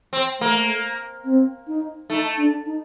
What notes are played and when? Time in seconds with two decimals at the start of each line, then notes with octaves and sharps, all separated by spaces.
0.13 C4
0.40 A3 A#3
1.25 C4
1.67 D#4
2.10 A3 D#4
2.37 D4
2.66 D#4